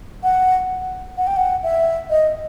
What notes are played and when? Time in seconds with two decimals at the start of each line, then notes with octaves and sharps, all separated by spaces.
0.23 F#5
1.17 F#5
1.27 G5
1.37 F#5
1.63 E5
2.10 D#5